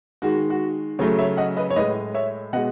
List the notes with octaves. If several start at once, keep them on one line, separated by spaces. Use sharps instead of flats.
D#3 G#3 F#4
F#4
C#3 F#3 A3 A4 C#5
C#5 E5
D#5 F#5
B4 D#5
C#5
A2 G#3 B4 D#5
C#5 E5
B2 G#3 D#5 F#5